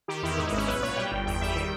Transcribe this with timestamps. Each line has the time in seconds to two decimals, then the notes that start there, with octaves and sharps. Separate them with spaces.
0.08 D#3 G4
0.23 E2 E4
0.37 G#2 D#4
0.47 E4
0.52 G#1
0.57 C#4
0.68 B1 B4
0.82 A#2 C#5
0.97 G3 G5
1.12 G1
1.26 E2 G5
1.41 G3 E5
1.56 D#3 G5